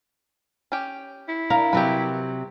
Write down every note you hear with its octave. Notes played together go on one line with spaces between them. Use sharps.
C#4 G4
E4
D4 A#4 F5
C3 F#3 G4 A4 B4